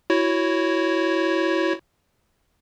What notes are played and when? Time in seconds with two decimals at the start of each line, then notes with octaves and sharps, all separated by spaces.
0.10 E4 F#4 C#5